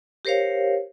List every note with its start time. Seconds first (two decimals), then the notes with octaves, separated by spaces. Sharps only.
0.25 G4 A#4 C5 C#5 F5